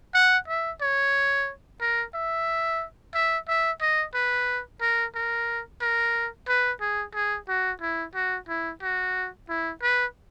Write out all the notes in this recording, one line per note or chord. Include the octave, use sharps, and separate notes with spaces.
F#5
E5
C#5
A#4
E5
E5
E5
D#5
B4
A#4
A#4
A#4
B4
G#4
G#4
F#4
E4
F#4
E4
F#4
E4
B4